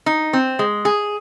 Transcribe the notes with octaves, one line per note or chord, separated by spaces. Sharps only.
D#4
C4
G#3
G#4